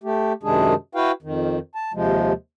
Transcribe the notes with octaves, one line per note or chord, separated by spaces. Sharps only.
A3 G4
F#2 C3 D#3 G#3 D4 G#4
E4 F#4 B4 F5 G5
F2 D#3
A5
D#2 C3 F3 G#3